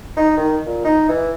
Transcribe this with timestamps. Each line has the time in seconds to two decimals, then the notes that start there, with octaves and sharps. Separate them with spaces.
0.17 D#4
0.37 D#3
0.66 A#2
0.84 D#4
1.09 E3